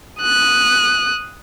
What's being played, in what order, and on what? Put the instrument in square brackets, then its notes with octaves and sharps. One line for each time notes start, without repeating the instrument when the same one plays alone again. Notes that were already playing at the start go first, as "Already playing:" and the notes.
[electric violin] D#6 F#6